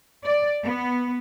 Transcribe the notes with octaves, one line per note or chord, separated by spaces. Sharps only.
D5
B3